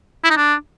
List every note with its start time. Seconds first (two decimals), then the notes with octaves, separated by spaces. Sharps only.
0.24 E4
0.30 D#4
0.37 D4